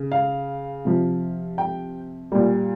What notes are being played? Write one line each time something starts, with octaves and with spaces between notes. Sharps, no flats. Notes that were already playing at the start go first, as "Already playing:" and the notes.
Already playing: C#3
F5
C3 F3
G5
A#2 G3